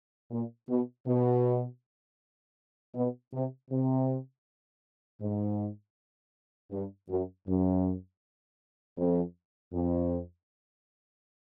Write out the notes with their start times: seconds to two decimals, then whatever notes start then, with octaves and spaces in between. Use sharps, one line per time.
0.31 A#2
0.69 B2
1.06 B2
2.95 B2
3.33 C3
3.71 C3
5.21 G#2
6.72 G2
7.09 F#2
7.47 F#2
8.97 F2
9.73 F2